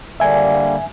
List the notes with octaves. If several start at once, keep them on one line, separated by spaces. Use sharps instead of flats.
D3 G3 A#3 E5 G#5